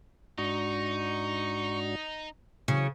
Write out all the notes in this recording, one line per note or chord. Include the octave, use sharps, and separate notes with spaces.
G#2 D4 D#4 F#4 C#6
C#3 E3 F#3 C#5